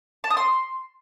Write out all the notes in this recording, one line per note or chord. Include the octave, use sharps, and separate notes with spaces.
A5
D#6
C6